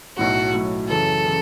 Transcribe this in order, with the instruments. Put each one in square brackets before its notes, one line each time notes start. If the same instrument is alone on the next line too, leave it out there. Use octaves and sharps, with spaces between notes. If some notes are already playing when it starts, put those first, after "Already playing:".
[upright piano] B1 A2 F#3 [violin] F#4
[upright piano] B1 A2 F#3
[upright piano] F#2 C#3 E3 [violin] A4
[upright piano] C#3 E3